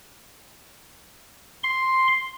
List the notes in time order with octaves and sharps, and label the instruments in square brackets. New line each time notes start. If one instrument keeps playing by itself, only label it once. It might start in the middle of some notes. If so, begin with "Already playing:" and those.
[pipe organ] C6